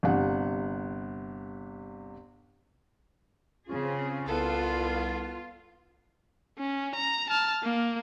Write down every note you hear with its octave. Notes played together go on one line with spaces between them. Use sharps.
G1 C3 G4 F#5
C#3 C4 C#4 F4 G#4
C2 B3 F4 A4
C#4
A#5
A5 F6
A#3